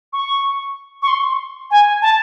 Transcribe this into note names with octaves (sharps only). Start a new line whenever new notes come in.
C#6
C#6
C6
G#5
A5